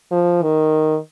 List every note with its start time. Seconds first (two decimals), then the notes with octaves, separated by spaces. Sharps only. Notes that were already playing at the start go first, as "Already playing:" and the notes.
0.11 F3
0.42 D#3